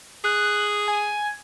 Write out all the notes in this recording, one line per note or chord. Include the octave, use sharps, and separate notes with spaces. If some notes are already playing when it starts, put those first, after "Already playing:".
G#4 F#6
G#5